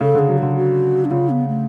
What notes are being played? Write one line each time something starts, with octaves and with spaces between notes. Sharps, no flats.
C#3 A4
D3 G#4
F#3
D3 F#4
F#4
D4
C#3 F4
B3
A3